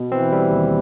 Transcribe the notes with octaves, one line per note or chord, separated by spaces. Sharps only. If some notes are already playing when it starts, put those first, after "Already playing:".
Already playing: B2
E3 C4
G3
D#2